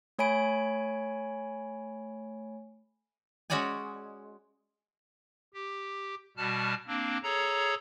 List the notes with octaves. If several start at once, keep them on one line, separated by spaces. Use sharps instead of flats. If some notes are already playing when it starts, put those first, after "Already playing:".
A3 C#5 G#5 B5 D7
G#3 C#4 F#4 C#5 D5 G#5
G4
B2 G3 F#4 A5 F6
A#3 C4 D4
G#4 A4 C#5 A#5